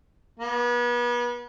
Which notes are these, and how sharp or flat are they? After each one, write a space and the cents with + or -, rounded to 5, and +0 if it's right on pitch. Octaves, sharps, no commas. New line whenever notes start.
B3 -35